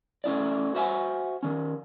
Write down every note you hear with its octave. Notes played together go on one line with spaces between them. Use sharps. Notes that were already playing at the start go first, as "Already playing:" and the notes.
A3 C#4 E4 D5
F#4 C5 E5 F#5 G#5
D#3 C#4